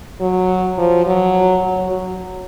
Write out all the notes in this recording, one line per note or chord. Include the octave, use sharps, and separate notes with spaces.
F#3
F3
F#3
F#3
F#3